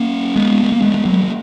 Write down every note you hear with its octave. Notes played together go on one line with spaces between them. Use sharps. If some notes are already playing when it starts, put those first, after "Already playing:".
Already playing: A#3 C#4
G#3 B3
G#3
A#3
G#3 B3
G#3
F#3 A#3
F#3